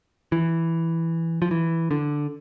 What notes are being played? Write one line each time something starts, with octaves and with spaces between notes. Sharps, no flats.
E3
F3
E3
D3